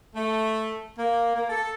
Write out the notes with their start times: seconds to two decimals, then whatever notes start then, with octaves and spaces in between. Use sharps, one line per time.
0.15 A3
0.97 A#3
1.35 A#3
1.49 A4